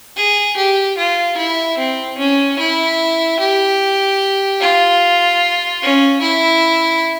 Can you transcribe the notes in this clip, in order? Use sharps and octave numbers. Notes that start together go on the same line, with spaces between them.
G#4
G4
F4
E4
C4
C#4
E4
G4
F4
C#4
E4